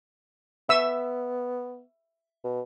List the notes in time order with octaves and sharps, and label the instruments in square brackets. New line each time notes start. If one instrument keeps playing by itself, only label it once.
[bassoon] B3 [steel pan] E5 E6
[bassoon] B2